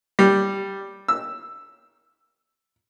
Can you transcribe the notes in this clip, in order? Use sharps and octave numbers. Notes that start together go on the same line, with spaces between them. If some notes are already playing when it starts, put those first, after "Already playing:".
G3
E6